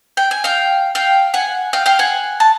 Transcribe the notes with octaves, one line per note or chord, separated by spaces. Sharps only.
G5
G#5
F5 G5
F5 G5
F#5 G#5
F5 G5
F5 G5
F#5 G#5
A5